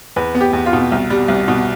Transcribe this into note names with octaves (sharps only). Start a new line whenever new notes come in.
E2 B4
B3
G4
E2
F4
B2
C2
G3
C2
B2